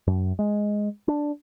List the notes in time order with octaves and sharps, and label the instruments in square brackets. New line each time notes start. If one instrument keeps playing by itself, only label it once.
[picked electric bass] F#2
G#3
D4